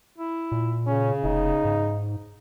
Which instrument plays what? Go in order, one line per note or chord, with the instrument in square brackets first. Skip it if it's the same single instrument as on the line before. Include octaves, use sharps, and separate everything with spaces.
[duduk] E4
[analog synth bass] A#2
[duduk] C#3 [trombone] C#4
[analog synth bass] F1 [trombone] D#4
[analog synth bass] G#2